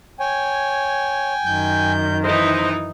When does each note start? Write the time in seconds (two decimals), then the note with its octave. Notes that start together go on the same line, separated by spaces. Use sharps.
0.20 C#5 G5 G#5
1.45 F#2 D#3 G6
2.24 E3 D#4 C5 D#5